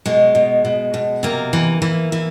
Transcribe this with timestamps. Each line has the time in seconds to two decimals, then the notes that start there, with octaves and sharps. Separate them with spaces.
0.06 B2 G#3
0.35 B2
0.65 B2
0.94 B2
1.23 C3 A#3
1.53 E3
1.82 E3
2.12 E3